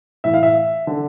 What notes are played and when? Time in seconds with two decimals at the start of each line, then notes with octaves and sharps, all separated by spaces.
0.24 A2 E3 E5
0.34 F5
0.43 E5
0.87 D3